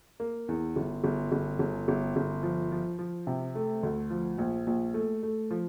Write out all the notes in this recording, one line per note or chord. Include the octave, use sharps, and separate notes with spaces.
A#3
E2
G1
G1
G1
G1
G1
G1
F3
F3
F3
C3
A3
D2
F3
A#1
A#1
A3
A3
F3